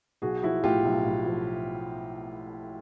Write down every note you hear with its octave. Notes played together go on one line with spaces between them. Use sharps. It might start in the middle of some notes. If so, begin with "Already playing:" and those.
B1 F#4 G#4
F3 E4 F#4
A2 F4 G4
B1
B1
F3